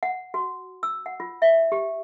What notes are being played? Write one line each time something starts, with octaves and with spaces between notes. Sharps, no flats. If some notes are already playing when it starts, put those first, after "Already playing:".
F#5
F#4
E6
F#5
F4
E5
G4